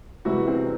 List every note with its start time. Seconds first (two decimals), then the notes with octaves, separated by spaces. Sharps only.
0.25 C2 C3 E3 G#3 B3 E4 F#4
0.48 C4